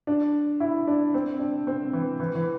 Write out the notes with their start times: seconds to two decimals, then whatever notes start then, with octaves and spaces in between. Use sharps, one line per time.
0.07 D4
0.60 E4
0.87 D4
1.14 C4
1.40 D4
1.67 C4
1.93 E3
2.20 E3
2.35 E3